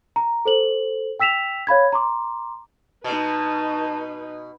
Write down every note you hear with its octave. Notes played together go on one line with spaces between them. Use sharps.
A#5
A4 C5 F#7
G5 E6 B6 E7 F7
C#5 F5 B5 G#6
A#5 C6 D6
B2 D#4 B4 A5